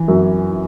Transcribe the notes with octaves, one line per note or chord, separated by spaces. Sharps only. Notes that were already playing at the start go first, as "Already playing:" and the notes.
Already playing: E3
F#2